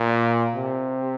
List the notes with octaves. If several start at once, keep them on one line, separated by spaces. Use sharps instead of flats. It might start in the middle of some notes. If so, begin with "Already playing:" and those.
Already playing: A#2
C3